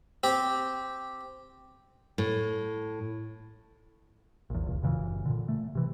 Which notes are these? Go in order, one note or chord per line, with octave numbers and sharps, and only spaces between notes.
C4 G4
A2
A#1 E2
F1 C#2
F#1 A#2 C#3 E3
A#2 D3
A3
C3 E3